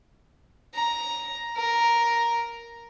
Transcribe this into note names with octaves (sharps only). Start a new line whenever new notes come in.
A#5
A#4